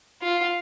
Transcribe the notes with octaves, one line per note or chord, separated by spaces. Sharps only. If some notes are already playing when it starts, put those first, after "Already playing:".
F4